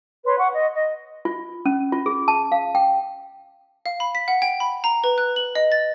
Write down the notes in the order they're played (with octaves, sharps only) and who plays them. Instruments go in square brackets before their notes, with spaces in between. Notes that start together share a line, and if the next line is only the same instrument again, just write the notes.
[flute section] B4 C#5 C6
F#5 C#6
D#5
D#5
[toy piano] F4
C#4
F4
G#4
A5
F5
G5
[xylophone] F5
B5
B6
F#5
G5
B5
A#5
B4
F#6
F#7
D#5
A6